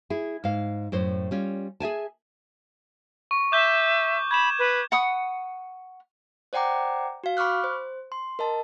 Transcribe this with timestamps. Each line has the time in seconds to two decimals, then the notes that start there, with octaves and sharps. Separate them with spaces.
0.10 E4 G#4
0.44 G#2 F5
0.92 F#2 A2 C5
1.31 G3 C#4 F4
1.80 G#4 E5 G#5 A5
3.31 C#6
3.52 E5 D6 G6 G7
4.31 B5 G#6 E7
4.59 B4
4.92 F#5 B5 C#6 D#6
6.53 C5 D5 F#5 G5 A#5 D6
7.24 F#4 F5
7.37 B5 C#6 D6 F6 F#6
7.64 C5
8.12 C6
8.39 A#4 D#5 A5